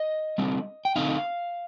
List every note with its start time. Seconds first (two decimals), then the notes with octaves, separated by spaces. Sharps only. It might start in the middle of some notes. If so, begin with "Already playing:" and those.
Already playing: D#5
0.38 D3 G3 C4
0.85 G5
0.96 D3 A3 C4 D#4 F5